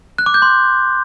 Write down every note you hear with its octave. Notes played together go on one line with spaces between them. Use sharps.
F#6
D6
G6
C6